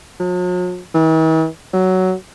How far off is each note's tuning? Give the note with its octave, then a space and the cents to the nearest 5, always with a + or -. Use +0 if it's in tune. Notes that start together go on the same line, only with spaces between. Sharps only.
F#3 -45
E3 -45
F#3 +10